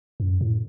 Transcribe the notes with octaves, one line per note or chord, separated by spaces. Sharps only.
F#2
A2